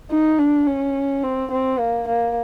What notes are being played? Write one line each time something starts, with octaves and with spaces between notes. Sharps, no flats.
D#4
D4
C#4
C4
C4
A#3
A#3